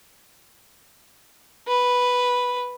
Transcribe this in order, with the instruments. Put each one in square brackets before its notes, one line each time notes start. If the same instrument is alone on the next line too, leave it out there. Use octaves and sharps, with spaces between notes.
[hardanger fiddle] B4